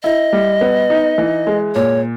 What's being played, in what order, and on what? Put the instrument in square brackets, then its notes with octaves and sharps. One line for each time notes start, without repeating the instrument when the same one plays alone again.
[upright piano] E4 [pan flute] D#5
[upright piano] G3
B3
D#4
E3
G#3
[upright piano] A#2 [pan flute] C#5